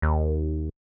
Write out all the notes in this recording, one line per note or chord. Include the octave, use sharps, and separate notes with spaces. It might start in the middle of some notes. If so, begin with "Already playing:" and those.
D#2